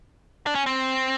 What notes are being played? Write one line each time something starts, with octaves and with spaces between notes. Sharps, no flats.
D4
C#4
C4